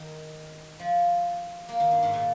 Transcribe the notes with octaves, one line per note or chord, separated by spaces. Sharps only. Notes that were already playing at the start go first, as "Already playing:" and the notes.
Already playing: D#3
F3
A#3
D#3
G2
G#2
A#2